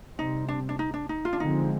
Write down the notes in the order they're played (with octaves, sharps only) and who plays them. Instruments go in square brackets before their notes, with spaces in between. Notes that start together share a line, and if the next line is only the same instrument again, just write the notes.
[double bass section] C3 G3 C4 [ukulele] D#4
[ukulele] D4
D4
D#4
D4
D#4
F4
D4
[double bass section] D3 F3 G#3 C4 [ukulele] D#4